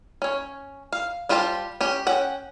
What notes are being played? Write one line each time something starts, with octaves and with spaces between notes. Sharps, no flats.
C#4 C#5
F5
G3 F4 G4 C5 A5
C#4 G4
C#4 F#5 G5